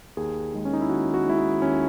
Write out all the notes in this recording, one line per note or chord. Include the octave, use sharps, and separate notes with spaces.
D#2 G#4
D#3 G#3
C#4
D#4
E4
D#2 F#4
F#4
D#3 G#3 E4
D#4
D#2 C#4